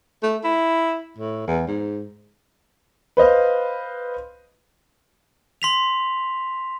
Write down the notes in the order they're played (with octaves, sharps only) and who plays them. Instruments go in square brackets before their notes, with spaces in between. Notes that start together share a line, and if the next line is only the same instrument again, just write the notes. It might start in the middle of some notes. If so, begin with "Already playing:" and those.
[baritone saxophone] A3
E4
A2
E2
G#2
[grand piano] B4 C5 D#5 F5
[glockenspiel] C6 B6 F7